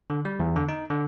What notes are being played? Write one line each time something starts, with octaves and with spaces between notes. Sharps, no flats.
D3
G3
E2
D3
D#4
D3